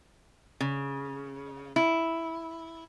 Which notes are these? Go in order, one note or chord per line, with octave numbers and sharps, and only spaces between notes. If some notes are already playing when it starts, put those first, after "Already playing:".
C#3
E4